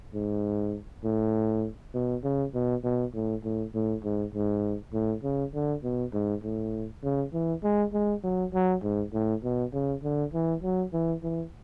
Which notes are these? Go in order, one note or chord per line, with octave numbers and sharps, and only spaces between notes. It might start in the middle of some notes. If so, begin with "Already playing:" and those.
G#2
A2
B2
C#3
B2
B2
A2
A2
A2
G#2
G#2
A2
C#3
D3
B2
G#2
A2
C#3
E3
G#3
G#3
F#3
F#3
G#2
A2
B2
C#3
D3
E3
F#3
E3
E3